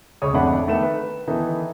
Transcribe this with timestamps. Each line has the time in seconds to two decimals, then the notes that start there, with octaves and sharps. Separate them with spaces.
0.22 C#2 C#3 C#5 D#6
0.33 G#1 F2 A3 D4 F#5 B5
0.67 D#3 A3 B3 E7
0.83 B4
1.28 D#3 E3 B3 D#4 A4